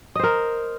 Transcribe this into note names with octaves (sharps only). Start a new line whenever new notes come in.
A#4 C5 D#5